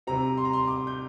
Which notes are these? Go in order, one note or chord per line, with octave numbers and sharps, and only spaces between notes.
C3 G3 C4 A#5
C6
A#5
C6
D6
G6